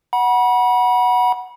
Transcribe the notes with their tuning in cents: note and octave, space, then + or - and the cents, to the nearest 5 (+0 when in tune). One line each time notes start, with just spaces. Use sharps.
F#5 +0 B5 -35